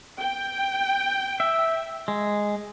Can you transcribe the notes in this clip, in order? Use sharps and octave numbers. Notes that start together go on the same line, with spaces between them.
G5
E5
G#3